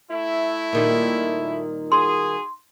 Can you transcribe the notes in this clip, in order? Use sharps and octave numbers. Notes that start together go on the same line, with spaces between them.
A3 E4
A#2 D#3 G3
F#4 G#4 C6